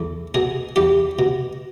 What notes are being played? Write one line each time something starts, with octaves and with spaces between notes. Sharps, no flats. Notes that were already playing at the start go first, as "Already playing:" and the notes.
Already playing: E2 A4
B2 G#4
E2 G4
B2